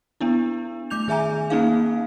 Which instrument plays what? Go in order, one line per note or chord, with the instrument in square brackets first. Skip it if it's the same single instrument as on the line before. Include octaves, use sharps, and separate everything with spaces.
[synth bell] B3 D4 E4
A3 D6 G6 F7
D#3 G#4 E5 G#5 A#5
A#3 C4 C#4 D#4 G#4 F5